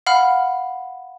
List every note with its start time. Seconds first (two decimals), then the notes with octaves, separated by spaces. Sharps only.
0.07 F5 F#5 B5 F6